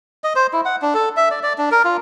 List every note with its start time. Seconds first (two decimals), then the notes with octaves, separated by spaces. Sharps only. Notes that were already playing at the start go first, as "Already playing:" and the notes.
0.24 D#5
0.36 C5
0.53 E4
0.65 F#5
0.82 D4
0.94 A4
1.17 E5
1.31 D5
1.43 D5
1.58 D4
1.71 A#4
1.85 F4